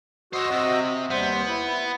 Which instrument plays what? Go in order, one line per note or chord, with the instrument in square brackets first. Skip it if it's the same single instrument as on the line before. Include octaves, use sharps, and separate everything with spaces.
[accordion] F#4 D#5 E6 [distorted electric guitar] C5 C#5
[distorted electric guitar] C3
[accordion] D#2 G3 C5 [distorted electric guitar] B3
[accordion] E4